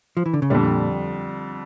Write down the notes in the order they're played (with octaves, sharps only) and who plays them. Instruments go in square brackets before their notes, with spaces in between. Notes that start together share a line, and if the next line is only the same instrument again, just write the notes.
[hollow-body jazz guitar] F3
E3
D3
C#3
[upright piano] F2 D3 G3 [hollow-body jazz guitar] A#2